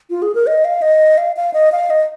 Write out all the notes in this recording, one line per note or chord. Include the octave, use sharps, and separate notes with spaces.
F4
G#4
A#4
D#5
F5
D#5
F5
F5
D#5
F5
D#5